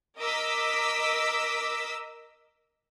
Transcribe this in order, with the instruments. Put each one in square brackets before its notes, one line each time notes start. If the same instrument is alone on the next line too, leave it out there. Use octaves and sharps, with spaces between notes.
[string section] A#4 D#5 D6 E6 B6